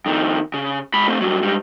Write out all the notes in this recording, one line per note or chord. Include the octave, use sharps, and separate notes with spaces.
F2 D#3
C#3
G#2 B5
A3 C4
G2 F#3
G#2 G3